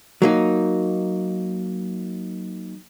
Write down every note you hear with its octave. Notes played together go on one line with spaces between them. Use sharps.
F#3 A#3 D#4